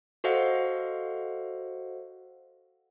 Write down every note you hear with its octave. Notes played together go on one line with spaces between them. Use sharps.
F#4 A4 C5 D#5 F5 F#5